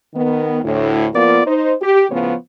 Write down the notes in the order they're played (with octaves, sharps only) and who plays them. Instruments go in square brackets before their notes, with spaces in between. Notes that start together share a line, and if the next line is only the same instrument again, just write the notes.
[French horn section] D#3 B3
D2 A2
F3 A#3 B3 F4 A#4 D5
D#4 C5
G4
A2 C#3 F3 B3 C#5